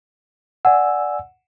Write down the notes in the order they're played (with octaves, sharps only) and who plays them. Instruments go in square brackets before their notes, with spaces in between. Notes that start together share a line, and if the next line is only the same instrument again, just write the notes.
[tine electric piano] D5 G#5 E6 [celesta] F#5